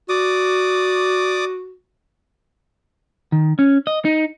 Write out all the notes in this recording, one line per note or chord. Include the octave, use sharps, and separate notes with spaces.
F#4 D5 D6 D#6
D#3
C#4
D#5
D#4